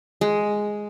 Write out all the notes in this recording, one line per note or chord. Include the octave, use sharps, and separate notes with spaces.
G#3